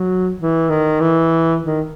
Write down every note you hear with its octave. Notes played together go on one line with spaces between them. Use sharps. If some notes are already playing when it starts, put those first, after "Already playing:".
Already playing: F#3
E3
D#3
E3
D#3